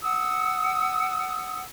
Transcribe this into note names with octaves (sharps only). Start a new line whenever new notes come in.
F#5 D#6 E6